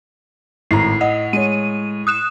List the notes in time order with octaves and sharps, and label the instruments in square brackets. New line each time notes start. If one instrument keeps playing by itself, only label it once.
[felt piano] G#1 A#5 [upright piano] A2 [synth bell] C7
[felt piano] D#5 [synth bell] F#5
[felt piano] G#3 C#5 [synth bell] D#7
[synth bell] D#6 F#6 E7